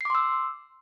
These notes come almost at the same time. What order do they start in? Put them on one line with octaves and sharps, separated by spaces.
C7 D6 C6 E6